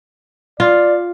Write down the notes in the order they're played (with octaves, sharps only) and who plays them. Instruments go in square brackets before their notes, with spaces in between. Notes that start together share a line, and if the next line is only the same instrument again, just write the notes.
[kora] F4 [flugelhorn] D5